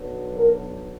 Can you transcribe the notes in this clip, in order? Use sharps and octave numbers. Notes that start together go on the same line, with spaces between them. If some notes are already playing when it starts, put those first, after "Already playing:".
Already playing: B1 B2 F#3 B3 D4
A#4